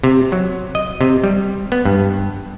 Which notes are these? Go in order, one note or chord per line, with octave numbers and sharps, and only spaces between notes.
C3
F#3
D#5
C3
G3
B3
G2